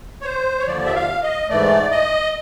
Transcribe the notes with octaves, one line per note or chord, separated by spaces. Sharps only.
C#5
C5
C#5
D#2 D3 F3 D5
E5
F5
D#5
G#2 E3 A3 D5
D#5